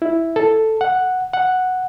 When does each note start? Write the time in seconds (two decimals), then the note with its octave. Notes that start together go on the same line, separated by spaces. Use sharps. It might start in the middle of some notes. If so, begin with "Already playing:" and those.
0.02 E4
0.36 A4
0.81 F#5
1.33 F#5